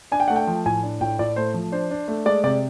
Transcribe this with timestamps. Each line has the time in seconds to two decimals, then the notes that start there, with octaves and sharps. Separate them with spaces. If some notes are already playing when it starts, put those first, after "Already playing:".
0.12 D4 G#5
0.20 G5
0.28 A3 F#5
0.36 G5
0.47 F3
0.66 A2 G#5
0.83 D4
1.01 A2 G5
1.19 A2 D5
1.36 A3 C5
1.54 F3
1.72 D4 C5
1.91 D4
2.08 A3
2.25 G#3 D5
2.44 C3 D5